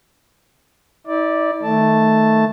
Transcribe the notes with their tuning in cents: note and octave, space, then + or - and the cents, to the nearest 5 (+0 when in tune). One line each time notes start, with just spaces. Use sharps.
E4 -45 D5 +0
D#3 +15 A3 +0 A5 +0